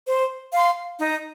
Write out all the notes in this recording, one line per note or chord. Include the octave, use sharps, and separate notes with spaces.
C5
F5 C6
D#4